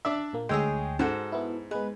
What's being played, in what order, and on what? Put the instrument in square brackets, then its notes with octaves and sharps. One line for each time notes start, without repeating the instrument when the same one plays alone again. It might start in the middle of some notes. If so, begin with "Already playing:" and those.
[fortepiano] D4 D5 E5
[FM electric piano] A#2 A#3
[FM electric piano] D2 G5 [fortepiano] G#3 E6 [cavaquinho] G#4 C#5 D#5
[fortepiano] G#2 [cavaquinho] F#4 A4 C5
[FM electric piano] B3 E4
[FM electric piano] G#3 B3 [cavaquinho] B4